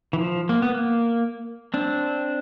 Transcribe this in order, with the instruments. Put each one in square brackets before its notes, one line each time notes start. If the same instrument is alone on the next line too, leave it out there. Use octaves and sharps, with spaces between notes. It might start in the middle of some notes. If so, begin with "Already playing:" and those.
[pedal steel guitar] E3
F3
A#3
B3
A#3
C4 D4